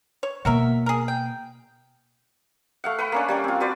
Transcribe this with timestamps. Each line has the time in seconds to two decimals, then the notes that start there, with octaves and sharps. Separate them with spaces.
0.23 C#5
0.45 B2 A#3 F#4 A#4 E5
0.86 G#4 A#4
1.08 G5
2.84 A3 F5 F#5
2.98 B4 F#5 B5
3.12 A#3 C#4 D4
3.28 G3 C#4 D4
3.44 C4 F4
3.60 F#4 B4 C5 D5